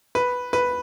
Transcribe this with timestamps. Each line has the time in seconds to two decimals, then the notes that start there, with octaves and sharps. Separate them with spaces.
0.15 B4
0.53 B4